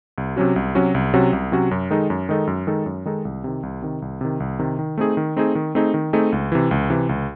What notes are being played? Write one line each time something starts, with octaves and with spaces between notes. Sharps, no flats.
C2
C3 F#3 C#4 F#4
C2
C3 F#3 C#4 F#4
C2
C3 F#3 C#4 F#4
C2
C3 F#3 C#4 F#4
F#2
D#3 G#3 D#4 A4
F#2
D#3 G#3 D#4 A4
F#2
D#3 G#3 D#4 A4
F#2
D#3 G#3 D#4 A4
C2
C3 D#3
C2
C3 D#3
C2
C3 D#3
C2
C3 D#3
D#3
A3 C4 D#4 G#4
D#3
A3 C4 D#4 G#4
D#3
A3 C4 D#4 G#4
D#3
A3 C4 D#4 G#4
C#2
C3 E3
C#2
C3 E3
C#2